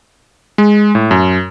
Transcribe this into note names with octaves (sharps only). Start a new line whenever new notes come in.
G#3
A2
F#2